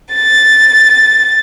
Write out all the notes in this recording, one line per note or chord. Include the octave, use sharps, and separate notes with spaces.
A6